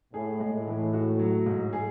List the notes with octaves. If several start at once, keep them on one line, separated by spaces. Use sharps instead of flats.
A2 G#4
G#3
A2
E3
F#4
F#3
G#2
G#4